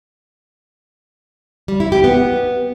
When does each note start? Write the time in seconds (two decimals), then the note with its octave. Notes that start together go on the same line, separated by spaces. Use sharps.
1.68 G3
1.80 E4
1.92 G4
2.04 B3